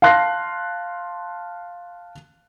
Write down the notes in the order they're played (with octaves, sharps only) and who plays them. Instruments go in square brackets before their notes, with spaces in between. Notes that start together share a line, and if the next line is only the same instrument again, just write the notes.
[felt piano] F5 A5 C6 F#6 A#6 C7